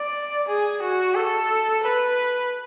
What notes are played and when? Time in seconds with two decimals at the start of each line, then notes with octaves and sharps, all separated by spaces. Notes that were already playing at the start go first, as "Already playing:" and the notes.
Already playing: D5
0.48 G#4
0.82 F#4
1.15 A4
1.83 B4